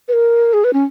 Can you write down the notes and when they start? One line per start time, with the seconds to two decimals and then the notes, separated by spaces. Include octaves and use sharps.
0.08 B4
0.13 A#4
0.53 G#4
0.64 B4
0.73 C#4